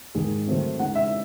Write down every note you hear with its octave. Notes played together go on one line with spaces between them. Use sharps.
G#2 D#3 G#3 D#4 G#4
D#3 F#3 A3 C4
C#3 G#3 D#4 F#5
E5